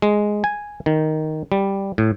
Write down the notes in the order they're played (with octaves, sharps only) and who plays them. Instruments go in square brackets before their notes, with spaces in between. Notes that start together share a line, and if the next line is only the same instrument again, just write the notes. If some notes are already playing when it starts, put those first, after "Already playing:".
[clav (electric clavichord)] G#3
G#5
D#3
G3
A2